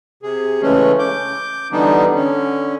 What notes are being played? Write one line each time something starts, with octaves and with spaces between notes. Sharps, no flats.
C3 G#4
C#3 E3 G#3 A3 C#4
D6 G6
D3 E3 G3 B3 D4 D#4
D3 C#4